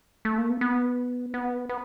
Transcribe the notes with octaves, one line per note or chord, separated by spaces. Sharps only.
A3
A#3
B3
B3
B3
B3